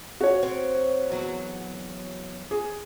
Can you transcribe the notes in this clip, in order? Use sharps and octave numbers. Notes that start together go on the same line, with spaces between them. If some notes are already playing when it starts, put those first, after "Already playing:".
F#4 C#5
C4
E2 F#3
G#4